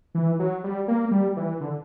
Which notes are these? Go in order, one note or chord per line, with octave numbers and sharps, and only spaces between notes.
E3
F#3
G3
A#3
G3
E3
D3